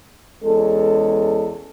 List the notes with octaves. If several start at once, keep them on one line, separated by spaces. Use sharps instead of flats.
E2 G#3 C#4 A4